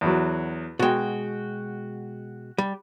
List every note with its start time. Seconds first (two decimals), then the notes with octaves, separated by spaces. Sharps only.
0.01 E2 F#3
0.79 B2 G#3 F#4 G5
2.58 G3